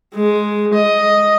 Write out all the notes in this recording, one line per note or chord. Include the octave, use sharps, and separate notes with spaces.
G#3
D#5